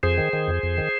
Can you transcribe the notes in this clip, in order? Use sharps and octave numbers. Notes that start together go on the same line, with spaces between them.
F2 G#4 C5
D#3
D#3
F2
F2
D#3